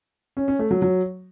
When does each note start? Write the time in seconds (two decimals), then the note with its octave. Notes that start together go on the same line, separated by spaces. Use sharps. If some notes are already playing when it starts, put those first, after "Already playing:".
0.37 C#4
0.48 C#4
0.59 A3
0.71 F#3
0.82 F#3